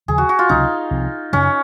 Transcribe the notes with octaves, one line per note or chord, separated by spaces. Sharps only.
D#2 C#3 F3 G#4
F#4
F#4
F4
C#2 C3 F#3 C#4 D#4
C2 C3 F3 C4
F#2 C#3 F#3 C#4